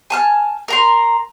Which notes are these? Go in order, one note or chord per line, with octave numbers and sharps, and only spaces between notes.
G#5 A5 F6
A#4 A#5 C6